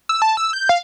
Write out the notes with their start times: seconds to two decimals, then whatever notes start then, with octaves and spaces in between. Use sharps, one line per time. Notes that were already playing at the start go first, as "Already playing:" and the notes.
0.09 E6
0.22 A5
0.37 E6
0.53 G6
0.69 F5